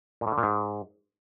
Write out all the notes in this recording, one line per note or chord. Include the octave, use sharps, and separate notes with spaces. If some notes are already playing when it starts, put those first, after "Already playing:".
A#2
A2
D3
A#2
G#2